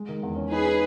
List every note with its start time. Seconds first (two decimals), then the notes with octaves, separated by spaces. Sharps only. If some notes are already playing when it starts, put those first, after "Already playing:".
Already playing: G#3
0.09 D#3
0.23 E2
0.36 C#4
0.51 D#4 G#4 B4
0.66 D#4